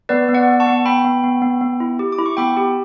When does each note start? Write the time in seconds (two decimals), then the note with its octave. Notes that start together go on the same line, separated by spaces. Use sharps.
0.09 B3 B4 D5
0.29 B3
0.34 D5 F#5
0.48 B3
0.60 A5 C#6
0.67 B3
0.85 B3 G5 B5
1.04 B3
1.23 B3
1.42 B3
1.61 B3
1.80 E4
1.99 G4
2.12 D6
2.19 E4
2.26 C#6
2.37 B3 G5 B5
2.57 G4